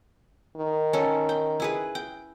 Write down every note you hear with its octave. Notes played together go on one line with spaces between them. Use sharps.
D#3
C#4 A4
G5
E4 G#4 B4
G5